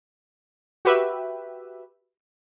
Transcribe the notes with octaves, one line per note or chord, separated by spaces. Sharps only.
F#4 G4 B4 E5